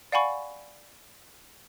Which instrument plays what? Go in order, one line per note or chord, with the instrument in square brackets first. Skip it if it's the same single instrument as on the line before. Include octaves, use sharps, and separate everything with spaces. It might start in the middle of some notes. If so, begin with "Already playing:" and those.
[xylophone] D5 F5 F#5 G#5 B5 C#6